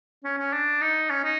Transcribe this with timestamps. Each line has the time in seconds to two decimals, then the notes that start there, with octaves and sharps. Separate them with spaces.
0.24 C#4
0.39 C#4
0.53 D4
0.81 D#4
1.10 C#4
1.24 D#4